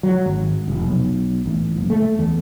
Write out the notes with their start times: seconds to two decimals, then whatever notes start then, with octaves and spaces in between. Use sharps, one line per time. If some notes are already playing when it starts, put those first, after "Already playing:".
0.03 F#3
0.26 G#1
0.68 F1
0.87 B1
1.46 A1
1.76 F#1
1.90 A3
2.19 E2